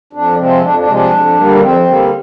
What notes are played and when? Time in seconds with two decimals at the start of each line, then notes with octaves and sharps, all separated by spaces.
0.13 F2 D4
0.37 C3 F3 G#3 C4
0.62 F2 D4
0.79 D4
0.87 C3 F3 G#3
0.95 D4
1.12 F2
1.36 D3 G3 A#3
1.60 F2 C4
1.86 D3 G3 A#3